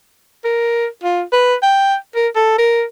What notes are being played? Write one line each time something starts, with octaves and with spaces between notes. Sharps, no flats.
A#4
F4
B4
G5
A#4
A4
A#4